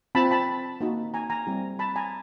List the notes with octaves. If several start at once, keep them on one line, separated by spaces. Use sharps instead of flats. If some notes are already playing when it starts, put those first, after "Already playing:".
C4 F4 A5 B5
A5 B5
A#3 D#4 F#4
G#5 A#5
G#5 A#5
G3 C4 E4 G4
A5 B5
G#5 A#5